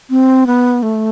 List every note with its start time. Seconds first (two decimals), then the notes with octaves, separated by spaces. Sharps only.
0.10 C4
0.47 B3
0.83 A3